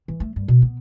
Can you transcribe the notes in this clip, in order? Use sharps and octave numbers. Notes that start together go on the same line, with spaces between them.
E3
A3
G2
B2
B3